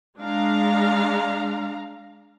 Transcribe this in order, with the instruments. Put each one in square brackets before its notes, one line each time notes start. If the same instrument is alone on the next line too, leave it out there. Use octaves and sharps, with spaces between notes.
[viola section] G#3 D4 F5 A#5